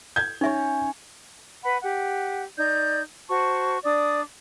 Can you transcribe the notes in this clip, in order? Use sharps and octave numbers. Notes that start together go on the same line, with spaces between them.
G6 G#6
C#4 D#4 C#5 E5
B4 F#5 B5
G4 F#5
D#4 D5 G6
F#4 C5 A5 C#6
D4 D5 D6 D#6